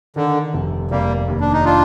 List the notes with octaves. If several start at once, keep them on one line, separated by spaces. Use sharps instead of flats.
D3 D#3
F1
F1 G3 A#3
D#2
D4
D#4
D4 F4